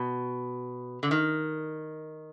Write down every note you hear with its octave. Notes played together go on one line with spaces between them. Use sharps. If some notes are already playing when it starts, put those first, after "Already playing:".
Already playing: B2
D3
D#3